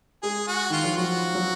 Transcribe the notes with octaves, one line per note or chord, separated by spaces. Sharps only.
G#3 G#4
F#4
D#3 F4
F3
F#3 F#4
F#3